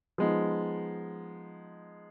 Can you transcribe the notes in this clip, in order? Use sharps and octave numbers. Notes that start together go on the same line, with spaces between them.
F3 G#3 B3 D#4